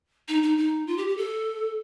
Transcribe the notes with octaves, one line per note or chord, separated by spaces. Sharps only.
D#4
D#4
D#4
F4
G4
G4
A4